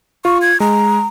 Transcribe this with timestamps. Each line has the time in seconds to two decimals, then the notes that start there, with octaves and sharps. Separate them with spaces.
0.25 F4 C#6
0.42 G#6
0.60 G#3 A#5